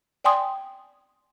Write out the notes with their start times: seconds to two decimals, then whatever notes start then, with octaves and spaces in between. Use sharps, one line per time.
0.24 D5 G5 G#5 C6 D#6